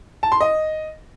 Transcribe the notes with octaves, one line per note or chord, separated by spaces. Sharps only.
A5
C6
D#5